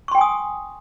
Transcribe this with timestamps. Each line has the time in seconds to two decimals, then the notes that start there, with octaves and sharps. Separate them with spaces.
0.08 C#6
0.11 C6
0.15 G5
0.18 G#5
0.21 D#6